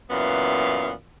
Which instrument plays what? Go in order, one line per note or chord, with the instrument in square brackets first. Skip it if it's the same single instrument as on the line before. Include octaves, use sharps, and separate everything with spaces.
[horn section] F#2 A#2 E3 B3 F5